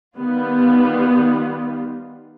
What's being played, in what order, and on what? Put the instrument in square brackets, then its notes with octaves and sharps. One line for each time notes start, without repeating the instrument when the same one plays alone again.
[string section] D#3 G3 B3 F4